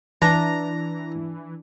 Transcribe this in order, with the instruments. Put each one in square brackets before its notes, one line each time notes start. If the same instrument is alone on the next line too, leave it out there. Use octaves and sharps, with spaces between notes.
[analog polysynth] E3 [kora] D4 [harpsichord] A#5